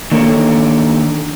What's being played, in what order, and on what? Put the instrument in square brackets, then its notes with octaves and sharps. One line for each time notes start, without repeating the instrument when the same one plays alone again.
[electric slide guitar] D#3 A#3 D4 A4 C#5